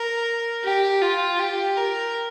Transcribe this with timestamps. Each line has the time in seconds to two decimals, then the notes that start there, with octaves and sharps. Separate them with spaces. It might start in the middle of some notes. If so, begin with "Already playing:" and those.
Already playing: A#4
0.64 G4
1.02 F4
1.40 G4
1.77 A#4